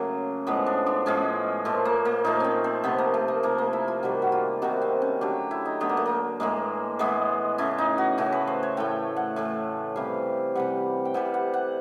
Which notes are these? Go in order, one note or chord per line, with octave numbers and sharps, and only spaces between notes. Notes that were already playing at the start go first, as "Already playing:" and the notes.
Already playing: C#3 F#3 A3 A#3
A2 F3 G#3 B3
D4
D4
A2 F3 G#3 C#4
A#2 F3 A3
A#3
A#3
A#2 F3 A3 D#4
C4 C#4
C4
C3 F3 A3 B3
A#3
A3
A#3
C3 F3 A3 A#3
A#3
E4
F4
C3 D#3 G3 F#4
F#4
F4
C3 D#3 G3 F#4
C4
C#4
D3 F#3 A3 G4
E4
D#4
D3 F#3 A3 B3
A#3
A3
A#3
A2 E3 G#3 A#3
A2 E3 G#3 B3
C#3 E3 A3
D#4
F#4
C#3 E3 A3 F#4
B4
C5
C#5
A2 E3 A3 G5
F#5
A2 E3 A3
C3 E3 G3 F5
C3 E3 G3 F#5
G5
C3 E3 G3 F#5
F#5
F#5